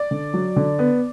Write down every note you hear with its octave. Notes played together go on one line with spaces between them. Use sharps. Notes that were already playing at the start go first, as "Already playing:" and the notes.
Already playing: D5
D3
F#3
D3
B3